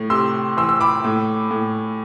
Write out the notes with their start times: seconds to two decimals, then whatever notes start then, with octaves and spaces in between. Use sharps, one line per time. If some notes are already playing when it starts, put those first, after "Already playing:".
Already playing: A2
0.10 C3 C6 E6
0.57 E3 C6 E6
0.69 E6
0.81 B5 D6
1.05 A2
1.51 A2